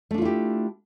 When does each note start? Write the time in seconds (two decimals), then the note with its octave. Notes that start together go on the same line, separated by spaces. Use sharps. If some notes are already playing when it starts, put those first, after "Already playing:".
0.11 A3
0.14 D4
0.18 F4
0.22 E4
0.25 G4